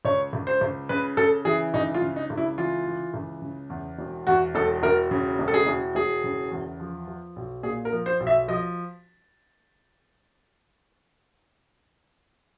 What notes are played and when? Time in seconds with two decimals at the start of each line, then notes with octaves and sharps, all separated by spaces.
0.05 C#2 C#5
0.33 C#2
0.47 C5
0.61 C#2
0.89 C#3 B4
1.17 C#3 A4
1.45 E3 G#4
1.74 C#2 D#4
1.94 F4
2.02 C#3
2.16 D#4
2.30 C#2
2.37 E4
2.58 E3 F4
2.87 E3
3.14 C#2
3.42 C#3
3.70 E2
3.99 E1
4.27 E2 F#4
4.55 E1 A4
4.83 E1 A#4
5.11 C#3
5.39 E1
5.48 A4
5.54 G#4
5.67 E1
5.95 E1 G#4
6.24 C#3
6.51 E2
6.80 F3
7.08 F3
7.36 B1
7.63 A#2 G#4
7.85 A#4
7.92 F3
8.06 C5
8.20 B1
8.27 E5
8.48 F3 D#5